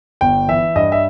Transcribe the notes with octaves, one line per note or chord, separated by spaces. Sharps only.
G1 G5
E3 E5
G2 D#5
E5